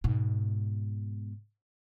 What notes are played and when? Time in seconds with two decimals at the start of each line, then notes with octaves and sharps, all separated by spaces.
0.04 G#2 B2